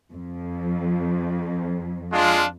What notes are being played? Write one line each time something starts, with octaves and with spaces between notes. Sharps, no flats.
F2
G#3 D4 F4